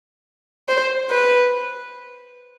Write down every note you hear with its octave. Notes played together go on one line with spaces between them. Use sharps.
C5
B4